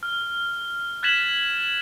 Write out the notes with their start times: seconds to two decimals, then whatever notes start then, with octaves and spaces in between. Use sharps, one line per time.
0.03 F6
1.03 F#6 G#6 A6 B6 E7 F#7